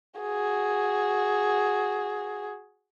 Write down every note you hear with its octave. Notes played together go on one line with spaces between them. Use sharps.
F#4 G#4